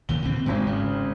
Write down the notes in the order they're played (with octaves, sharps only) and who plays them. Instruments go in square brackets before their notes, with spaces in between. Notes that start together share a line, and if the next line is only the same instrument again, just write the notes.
[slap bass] D#2 A#2 E3 [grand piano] G7
[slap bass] B2 D3 C4
[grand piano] G#1 C4 [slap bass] G#2 G#3
[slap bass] C#3